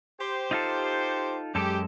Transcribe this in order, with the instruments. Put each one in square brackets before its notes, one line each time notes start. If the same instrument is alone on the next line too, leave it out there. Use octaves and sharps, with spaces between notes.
[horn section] G4 C5
[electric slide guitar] D#4 F4 A4
[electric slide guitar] F#2 G#3 A4 [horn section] G4